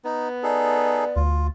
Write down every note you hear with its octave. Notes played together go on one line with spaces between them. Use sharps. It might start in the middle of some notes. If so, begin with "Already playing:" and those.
B3 D#4
D#4 G#4 A4 D5
D2 F4